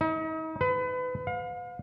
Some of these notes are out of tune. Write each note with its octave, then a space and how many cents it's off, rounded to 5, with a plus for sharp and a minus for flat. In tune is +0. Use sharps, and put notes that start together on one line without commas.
D#4 +40
B4 +30
F5 +40